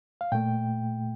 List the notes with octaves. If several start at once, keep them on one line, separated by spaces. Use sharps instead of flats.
F5
A#2 A3 G5